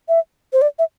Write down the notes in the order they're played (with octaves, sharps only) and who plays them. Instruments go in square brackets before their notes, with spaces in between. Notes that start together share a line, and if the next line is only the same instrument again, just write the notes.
[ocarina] E5
C5
D5
E5